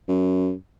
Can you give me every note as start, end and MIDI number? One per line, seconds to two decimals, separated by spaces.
0.08 0.52 42